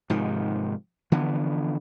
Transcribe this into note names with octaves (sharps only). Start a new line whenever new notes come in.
G#2 C3 D#3 F3
D3 E3 F3 B3